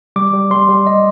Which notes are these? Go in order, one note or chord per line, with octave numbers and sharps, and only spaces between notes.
G3 D6
G3
G3 C6
G3
D#5